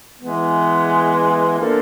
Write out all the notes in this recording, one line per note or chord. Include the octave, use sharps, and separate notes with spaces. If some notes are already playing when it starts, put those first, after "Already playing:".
E3 G#3 B3
A#3 D4 F4 A4 C5